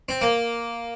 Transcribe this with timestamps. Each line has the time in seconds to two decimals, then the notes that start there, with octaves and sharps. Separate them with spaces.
0.09 C4
0.21 A#3